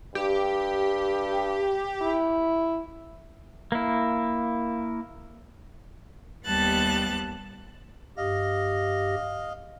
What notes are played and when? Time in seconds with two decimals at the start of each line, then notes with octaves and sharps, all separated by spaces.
0.15 G2 G4
2.02 E4
3.72 A#3 E4
6.45 D#2 G3 B3 A5 F#6 A6
8.17 G2 G4 D#5 F5 A#6